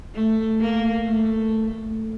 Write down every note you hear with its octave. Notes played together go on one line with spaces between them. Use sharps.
A3
A#3
A3